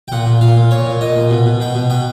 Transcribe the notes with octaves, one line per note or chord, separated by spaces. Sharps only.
G5
A#2 F#5
A#2
A#2 F5
A#2
A#2 C#5
A#2
A#2 D#5
A#2
B2
B2
B2 G5
B2
B2 G5